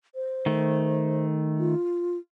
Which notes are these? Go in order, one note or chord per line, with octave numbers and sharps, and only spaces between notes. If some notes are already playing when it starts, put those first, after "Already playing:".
C5
D#3 A3
F4